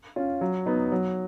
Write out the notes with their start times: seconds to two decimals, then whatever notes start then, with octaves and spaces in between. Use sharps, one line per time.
0.16 C#4 F4
0.41 F#3
0.66 B3 D#4
0.92 F#3